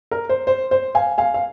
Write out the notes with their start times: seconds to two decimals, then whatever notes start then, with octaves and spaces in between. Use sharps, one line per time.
0.11 A#4
0.29 C5
0.47 C5
0.71 C5
0.95 F5 G#5
1.18 F5 G#5
1.34 F5